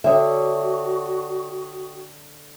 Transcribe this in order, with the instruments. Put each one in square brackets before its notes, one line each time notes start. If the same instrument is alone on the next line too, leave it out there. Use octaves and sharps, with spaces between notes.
[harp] D3 [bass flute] F#4 [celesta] A4 G5 D#6 [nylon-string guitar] C#5 E5